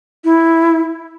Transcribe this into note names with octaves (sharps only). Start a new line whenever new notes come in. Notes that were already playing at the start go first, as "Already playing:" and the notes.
E4